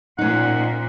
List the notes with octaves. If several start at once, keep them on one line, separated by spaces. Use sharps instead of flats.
A#2 F3 C#4 D#4 F#5